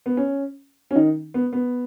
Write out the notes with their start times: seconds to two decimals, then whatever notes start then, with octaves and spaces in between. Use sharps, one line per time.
0.06 B3
0.17 C#4
0.91 C#4
0.95 D#3 D#4
1.34 B3
1.53 B3